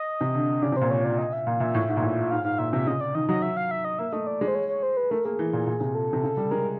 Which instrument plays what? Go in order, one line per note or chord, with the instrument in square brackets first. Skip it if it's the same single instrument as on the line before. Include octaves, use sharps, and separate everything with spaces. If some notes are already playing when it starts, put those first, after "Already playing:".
Already playing: [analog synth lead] D#5
[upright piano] C3
D3
[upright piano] C#3 [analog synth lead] D5
[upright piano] C3
[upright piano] A#2 [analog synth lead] C5
[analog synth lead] C#5
D5
D#5
E5
[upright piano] A#2 [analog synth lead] F5
[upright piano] A#2 [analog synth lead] E5
[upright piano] A2
G#2
A#2
A2
[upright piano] G#2 [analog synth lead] F5
[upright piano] G#2 [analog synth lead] F5
[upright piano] A#2 [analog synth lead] E5
[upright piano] C3 [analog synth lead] E5
[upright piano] C#3 [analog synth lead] D#5
[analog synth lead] D5
[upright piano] D#3 [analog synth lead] D#5
[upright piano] F#3 [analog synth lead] D#5
[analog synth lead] E5
F5
E5
D#5
[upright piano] A#3 [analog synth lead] E5
[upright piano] A3 [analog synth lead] D#5
[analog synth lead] D5
[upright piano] G#3
[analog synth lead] C5
C#5
C#5
C5
B4
[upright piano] A3 [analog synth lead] A#4
[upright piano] A#3 [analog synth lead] G#4
[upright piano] E3
A#2
A#2
C3
[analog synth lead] A4
[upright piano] C3
C#3
G3
[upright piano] G#3 [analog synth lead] A#4